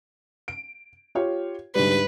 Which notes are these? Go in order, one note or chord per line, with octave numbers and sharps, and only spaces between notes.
D7
F4 G4 C#5
D2 G#2 G3 B4